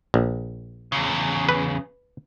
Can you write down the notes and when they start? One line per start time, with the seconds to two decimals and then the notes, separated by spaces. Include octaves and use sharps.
0.14 A#1
0.92 E2 C#3
1.49 B4